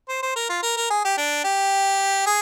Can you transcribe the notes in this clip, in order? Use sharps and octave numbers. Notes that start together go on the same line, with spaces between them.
C5
C5
A#4
F4
A#4
A#4
G#4
G4
D4
G4
G#4